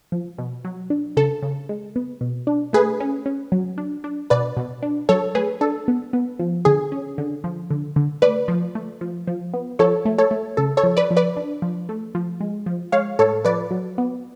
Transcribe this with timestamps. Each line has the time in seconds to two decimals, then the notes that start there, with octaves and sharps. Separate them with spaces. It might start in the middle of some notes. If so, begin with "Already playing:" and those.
0.12 F3
0.38 B2
0.65 F#3
0.90 D4
1.17 C#3 A4
1.42 C#3
1.69 G#3
1.96 B3
2.21 B2
2.47 D4
2.73 A3 G#4 B4
3.00 C#4
3.26 C#4
3.52 F#3
3.78 D4
4.04 D4
4.30 B2 B4 D5
4.57 B2
4.83 D4
5.09 F#3 A4 C#5
5.35 A3 G#4 B4
5.61 D4 A4
5.88 B3
6.13 B3
6.39 F3
6.65 D3 G#4
6.92 C#4
7.18 D3
7.44 F3
7.71 D3
7.96 D3
8.22 A3 B4 D5
8.48 F3
8.75 A3
9.01 F3
9.27 F3
9.54 B3
9.79 F3 A4 C#5
10.05 A3
10.18 A4 C#5
10.31 A3
10.57 C#3 A4
10.77 A4 C#5
10.84 F3
10.97 B4 D5
11.11 F3
11.17 B4 D5
11.37 D4
11.62 F3
11.89 A3
12.15 F3
12.40 G#3
12.66 F3
12.92 G#3 C#5 F5
13.19 A2 A4 C#5
13.45 F3 B4 D5
13.71 F#3
13.98 B3